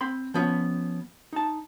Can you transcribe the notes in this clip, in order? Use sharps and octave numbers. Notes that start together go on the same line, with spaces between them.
C4 B5 C6
F3 B3 C#4
D#4 A5